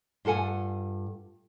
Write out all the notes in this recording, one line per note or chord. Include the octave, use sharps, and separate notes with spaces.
G2 F4 A4 F#5 G#5